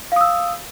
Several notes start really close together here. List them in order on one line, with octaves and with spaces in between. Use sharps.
F5 D#6 E6